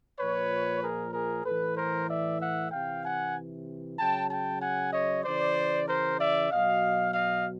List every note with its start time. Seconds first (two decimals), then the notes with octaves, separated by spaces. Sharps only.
0.20 A#2 F3 B4 C#5
0.82 G#4 A#4
1.14 G#4 A#4
1.45 A2 E3 A4 B4
1.77 A#4 C5
2.09 D5 E5
2.40 E5 F#5
2.72 C3 E3 F5 G5
3.04 F#5 G#5
3.99 C#3 F#3 G5 A5
4.31 G5 A5
4.61 F#5 G#5
4.93 C#5 D#5
5.25 C#3 E3 C5 D5
5.88 A#4 C5
6.19 D5 E5
6.52 B2 F#3 D#5 F5
7.14 D#5 F5